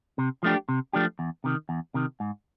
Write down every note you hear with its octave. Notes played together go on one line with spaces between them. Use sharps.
C3
F3 A3 D4 G4
C3
F3 A3 D4 G4
E2
C3 D#3
E2
C3 D#3
G#2